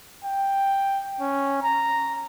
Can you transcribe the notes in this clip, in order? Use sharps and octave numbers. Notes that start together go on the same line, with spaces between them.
G5
C#4
A#5